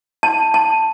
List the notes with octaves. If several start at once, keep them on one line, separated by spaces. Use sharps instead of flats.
A5
A5